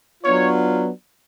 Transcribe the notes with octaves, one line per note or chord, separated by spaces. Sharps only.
F#3 B3 D4 F4 C#5